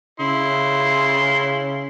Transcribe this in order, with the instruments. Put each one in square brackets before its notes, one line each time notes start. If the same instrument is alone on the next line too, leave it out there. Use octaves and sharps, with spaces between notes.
[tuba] C#3 [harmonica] E4 C6